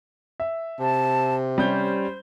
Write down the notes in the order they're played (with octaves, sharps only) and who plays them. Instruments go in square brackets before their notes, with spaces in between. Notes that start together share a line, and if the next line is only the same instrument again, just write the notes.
[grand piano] E5
[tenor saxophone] C3 [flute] A5
[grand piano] G3 C#4 G6 [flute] C5